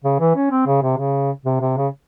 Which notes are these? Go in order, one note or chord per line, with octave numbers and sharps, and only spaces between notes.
C#3
E3
C#4
C4
C#3
C3
C#3
C3
C3
C#3